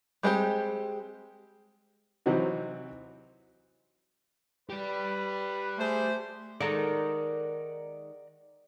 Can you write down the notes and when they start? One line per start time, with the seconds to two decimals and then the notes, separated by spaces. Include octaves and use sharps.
0.23 G3 G#3 C4 G4
2.26 C3 E3 F#3 C4 D#4 F#4
4.70 G4 B4 D5
5.78 A3 G#4 C5
6.61 D#3 G#3 A4 D5 F#5 A#5